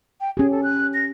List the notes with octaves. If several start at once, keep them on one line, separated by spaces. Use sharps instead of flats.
G5
C#4 G4 G#4
A4
F#6
A#6